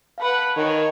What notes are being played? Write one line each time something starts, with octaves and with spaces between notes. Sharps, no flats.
B4 F5 F#5 A5 B5
D#3 C#5